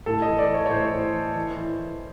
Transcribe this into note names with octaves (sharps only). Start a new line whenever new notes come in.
A2 A4
D#5
E3
D5
E3
C#5
C#5
A2 C5
A2
E3
E3
E3
E3